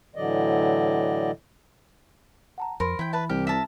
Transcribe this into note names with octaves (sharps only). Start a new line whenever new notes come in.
A2 D3 E3 F#3 D5 D#5
F#5 A5 A#5
F2 A#4 C5 B5 C6
E3 E4 G5
B4 E5 A5 B5
C2 G4 F6
E5 A5 A#5